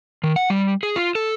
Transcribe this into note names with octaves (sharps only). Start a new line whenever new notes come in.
D#3
F#5
G3
G#4
F4
A4